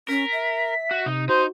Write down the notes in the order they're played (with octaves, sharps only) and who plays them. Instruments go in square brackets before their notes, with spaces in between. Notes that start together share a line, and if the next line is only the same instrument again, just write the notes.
[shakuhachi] C#4 [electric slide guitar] A#4 [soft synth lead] B6
[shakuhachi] E5
[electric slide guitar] F#4
[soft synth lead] C3 [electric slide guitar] D#4
[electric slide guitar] D#4 [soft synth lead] F#4 [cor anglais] C5